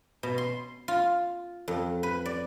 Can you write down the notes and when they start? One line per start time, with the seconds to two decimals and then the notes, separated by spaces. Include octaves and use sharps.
0.23 B2
0.38 C6
0.88 F4
1.68 F2
2.03 B4
2.26 D5